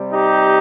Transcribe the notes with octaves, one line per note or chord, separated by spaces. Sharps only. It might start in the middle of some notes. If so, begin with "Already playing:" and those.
Already playing: C3 G3
D#4 G4